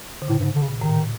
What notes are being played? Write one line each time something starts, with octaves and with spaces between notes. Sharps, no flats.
D3
A2 C#3
G2
G#2
D3
C#3
A#2
A2 D#3